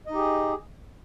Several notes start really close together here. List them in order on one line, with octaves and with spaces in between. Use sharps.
D#5 D#4 G4 G#4